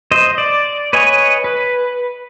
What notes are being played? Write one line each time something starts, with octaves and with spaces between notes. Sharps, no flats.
C5 D#5
D5
B4 C#5 D#5 G#5
B4